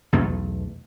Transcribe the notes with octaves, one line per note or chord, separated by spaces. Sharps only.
B1 E2 B2 A3